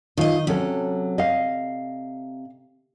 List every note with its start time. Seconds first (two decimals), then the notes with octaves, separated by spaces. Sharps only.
0.17 D#3 D#4 F4 D#5
0.47 C3 F#3 C#4 A4
1.18 D#5 F5